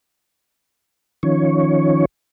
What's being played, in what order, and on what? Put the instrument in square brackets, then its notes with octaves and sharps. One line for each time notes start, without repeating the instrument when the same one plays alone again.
[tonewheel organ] D#3 F3 C#4 C#5